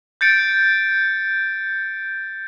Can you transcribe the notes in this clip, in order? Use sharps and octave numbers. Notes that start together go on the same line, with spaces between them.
G6 A6 C#7 D7